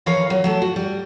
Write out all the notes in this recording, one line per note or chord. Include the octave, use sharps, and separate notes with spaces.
D#2 E3 F3 A#4 C#5 F5
F#3
F#3 A3 A5
F#4
G3